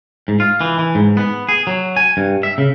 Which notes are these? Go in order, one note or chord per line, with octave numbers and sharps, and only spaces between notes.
G#2
F4
E3
E3
G#2
B3
G#4
F#3
G#5
G2
E5
C#3